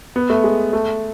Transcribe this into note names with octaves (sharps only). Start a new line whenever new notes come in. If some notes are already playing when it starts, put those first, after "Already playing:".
B3
A3
G#3
A3